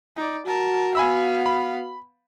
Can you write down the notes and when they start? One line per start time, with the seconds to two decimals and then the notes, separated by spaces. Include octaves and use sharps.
0.16 D#4 D5
0.46 F#4 A#4 A5
0.95 B3 F5 G#5 B5 E6
1.46 B5